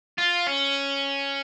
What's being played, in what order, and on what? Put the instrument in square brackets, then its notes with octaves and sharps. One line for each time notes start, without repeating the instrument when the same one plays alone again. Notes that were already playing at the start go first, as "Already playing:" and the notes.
[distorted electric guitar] F4
C#4